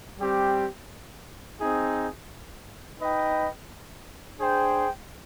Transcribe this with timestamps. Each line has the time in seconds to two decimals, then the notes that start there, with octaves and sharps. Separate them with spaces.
0.19 G3 C4 G4
1.59 C4 D#4 G#4
3.00 D#4 B4 D#5 G5
4.39 D4 G#4 C5 G5